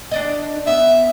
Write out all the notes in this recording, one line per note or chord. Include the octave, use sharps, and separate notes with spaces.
D4 D5 D#5
B3 E5